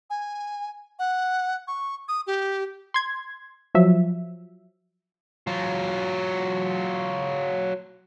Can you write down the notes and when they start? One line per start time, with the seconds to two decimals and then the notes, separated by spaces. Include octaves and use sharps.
0.10 G#5
0.99 F#5
1.68 C#6
2.08 D#6
2.27 G4
2.94 C6 G#6
3.75 F3 F#3 E5
5.47 F#3 F4